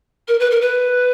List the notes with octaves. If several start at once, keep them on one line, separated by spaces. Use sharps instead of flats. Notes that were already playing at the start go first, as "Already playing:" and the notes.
A#4
B4
A#4
B4